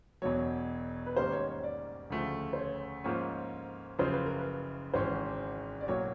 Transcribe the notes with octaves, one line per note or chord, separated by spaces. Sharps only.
E1 E2 B2 F#3 C#5
B4
G#2 D#3 G3 A#3 C#4 C5
C#5
C#5
D5
D2 C#3 F3 A3
C5
C#5
G#2 F3 A#3 C#4
F#1 F#2 C#3 F3 C5
B4
A#4
B4
G#1 G#2 E3 G#3 C#4 C5
D5
B1 A2 F#3 A#3 C#5